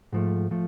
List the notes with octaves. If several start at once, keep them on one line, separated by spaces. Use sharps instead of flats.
G#2 F3 A3
F3 A3